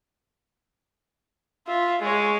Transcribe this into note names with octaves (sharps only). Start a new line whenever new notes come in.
F4 E5
G#3 C#5